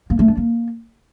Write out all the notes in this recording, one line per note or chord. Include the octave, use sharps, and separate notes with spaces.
A#3
A3
D4
A#3